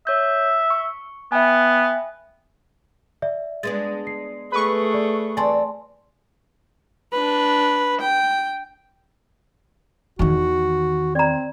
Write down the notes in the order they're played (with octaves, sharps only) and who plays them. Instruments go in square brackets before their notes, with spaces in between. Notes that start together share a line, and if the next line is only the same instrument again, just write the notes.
[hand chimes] C#5 G6 [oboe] E5
[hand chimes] C#6
[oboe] B3 [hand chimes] E5 G5 G#5
[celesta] D5 E5
[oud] G#3 B3 D4 [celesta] A6
[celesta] C7
[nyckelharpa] A3 G#4 [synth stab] B4 C#6
[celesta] D5
[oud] E2 C4 D5 [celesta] G#5 A5 C6
[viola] D4 B4
G5
[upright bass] E2 D#3 [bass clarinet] F#4
[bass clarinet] C4 [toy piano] D5 A#5